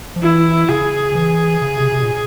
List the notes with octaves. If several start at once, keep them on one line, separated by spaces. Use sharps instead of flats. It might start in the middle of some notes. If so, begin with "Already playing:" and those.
F3
E3 E4
C#3 G#4
E3
C#3
C3
C3
A#2